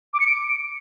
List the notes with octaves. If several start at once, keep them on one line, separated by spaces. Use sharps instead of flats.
D6
C#7
D7